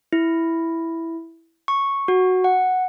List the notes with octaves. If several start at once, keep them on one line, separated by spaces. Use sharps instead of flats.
E4
C#6
F#4
F#5